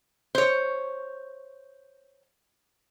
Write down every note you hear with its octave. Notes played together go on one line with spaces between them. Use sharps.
C5 C#5